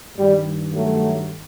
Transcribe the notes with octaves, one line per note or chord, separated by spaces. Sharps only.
G2 D#3 G3
F#3 A3